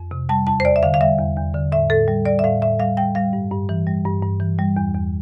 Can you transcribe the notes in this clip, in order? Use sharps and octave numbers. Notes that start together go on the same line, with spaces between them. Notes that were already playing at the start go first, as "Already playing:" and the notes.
Already playing: F2
C3
G3 A5
E2 A5
C5
E2 D5
E5
D3 F5
F5
G3 E5
E2
E2
D3
A2 E5
A2 A4
G3
G3 D5
E5
A2 F5
A2 E5
G3 F5
G3 G5
G3 F5
G2
G2
E3
G3
G2
G2
E3
G3
E2
E2